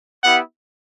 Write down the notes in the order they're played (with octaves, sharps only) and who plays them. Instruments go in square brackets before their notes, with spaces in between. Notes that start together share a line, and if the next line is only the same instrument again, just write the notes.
[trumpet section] B3 E4 G4 F#5